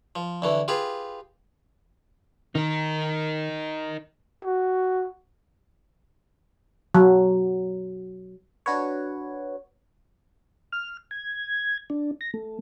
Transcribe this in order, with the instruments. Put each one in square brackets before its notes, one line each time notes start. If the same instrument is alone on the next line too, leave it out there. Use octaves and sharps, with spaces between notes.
[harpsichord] F3
D2 E3 A3
F4 G4 G#4 B4
[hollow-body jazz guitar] D#3 [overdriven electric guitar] D#4 A#4
[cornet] F#4
[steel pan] F#3
[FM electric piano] D4 F#4 B4 C#5
[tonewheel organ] F6
G#6
D4
A#6
A3